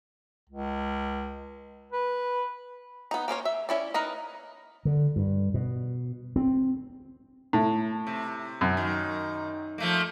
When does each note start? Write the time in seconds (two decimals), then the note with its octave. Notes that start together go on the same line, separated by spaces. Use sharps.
0.50 C#2
1.92 B4
3.11 B3 D#4
3.28 A#3 C#4 C5 C#5
3.45 E5
3.69 C#4 E4 D5
3.94 D#4 A#4 B4 D#5
4.85 D3
5.16 G2
5.54 B2
6.36 C4
7.53 A2
8.07 C3
8.61 F#2
8.77 D#3
9.78 F3 A3 A#3